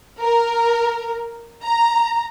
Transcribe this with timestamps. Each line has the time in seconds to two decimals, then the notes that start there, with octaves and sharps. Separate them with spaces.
0.19 A#4
1.64 A#5